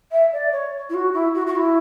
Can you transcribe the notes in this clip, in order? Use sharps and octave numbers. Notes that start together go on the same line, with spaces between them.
E5
D5
C#5
E4
F#4
E4
F#4
F#4
E4